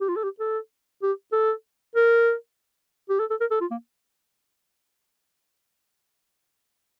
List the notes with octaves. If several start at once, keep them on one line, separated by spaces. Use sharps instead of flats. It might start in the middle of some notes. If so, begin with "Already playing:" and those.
G4
F4
A4
G4
A4
G4
A4
A#4
G4
A4
A4
A#4
A4
F4
A#3